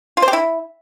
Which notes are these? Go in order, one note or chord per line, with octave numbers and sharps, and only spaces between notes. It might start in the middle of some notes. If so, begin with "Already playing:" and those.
F4
C5
G4
E4